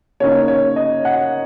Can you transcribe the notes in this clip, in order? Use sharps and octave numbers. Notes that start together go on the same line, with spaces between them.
C#3 A#3 D#4 C#5
C#5
D#5
F#5